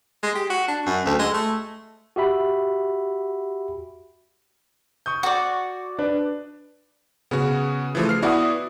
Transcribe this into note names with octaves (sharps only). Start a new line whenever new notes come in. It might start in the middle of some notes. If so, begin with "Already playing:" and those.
G#3
G4
F#4
D4
F#2
D2
G#3
A3
F#4 G4 E5 B5
C#6 D#6 G6
F#4 D5
D4 B4 D5
C#3 B3 F#4
E3 F3 A3
F6 C7
B3 E4 F#4 D5 F#5 D#6